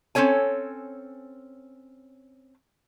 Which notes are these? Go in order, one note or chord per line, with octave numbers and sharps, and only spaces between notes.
C4 C#4 A4 C#5 G#5